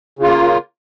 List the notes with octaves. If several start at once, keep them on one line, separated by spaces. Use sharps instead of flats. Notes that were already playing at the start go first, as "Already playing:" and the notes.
C#3 A#3 F4